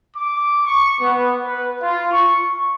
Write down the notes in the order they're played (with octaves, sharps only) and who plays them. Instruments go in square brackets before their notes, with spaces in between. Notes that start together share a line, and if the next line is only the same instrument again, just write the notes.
[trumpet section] D6
C#6
B3
B4
F4
C#6